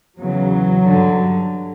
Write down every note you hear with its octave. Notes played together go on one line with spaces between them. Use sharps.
E2 C#3 E3 F#3
G2 D3